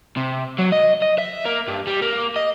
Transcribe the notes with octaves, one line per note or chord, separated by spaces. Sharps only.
C3
F#3
D#5
D#5
E5
A#3
G2
G3
A#3
D#5